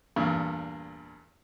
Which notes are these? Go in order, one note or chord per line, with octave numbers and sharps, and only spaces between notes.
E2 G2 A#2